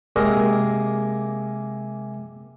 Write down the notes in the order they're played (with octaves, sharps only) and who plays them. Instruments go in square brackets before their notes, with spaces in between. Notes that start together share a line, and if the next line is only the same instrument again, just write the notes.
[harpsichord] C3 G#3 A#3 A#4 D#5